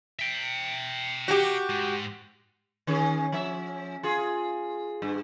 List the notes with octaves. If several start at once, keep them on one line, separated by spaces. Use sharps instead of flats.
E5 G5
F#4 G4
G#2
D#3 C#4 G#4
F3 C#4 E5
F4 G#4
G2